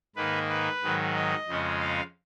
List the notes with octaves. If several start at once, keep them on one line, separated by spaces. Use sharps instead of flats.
G#2 D#3 A#3 B4
B4
G#2 D#3 F#3
D#5
F2 C#3 G#3 C#4
F5